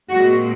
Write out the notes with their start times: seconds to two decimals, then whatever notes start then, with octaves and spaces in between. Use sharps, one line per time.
0.10 A#2 G#3 C4 F#4